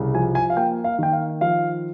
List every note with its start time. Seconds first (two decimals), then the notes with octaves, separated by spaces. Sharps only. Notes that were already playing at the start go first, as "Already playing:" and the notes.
Already playing: C2 C#3
0.14 F3 G#5
0.35 G#5
0.50 F5
0.57 A#3 G5
0.84 F5
0.99 D#3 G5
1.13 F5
1.41 F3 F5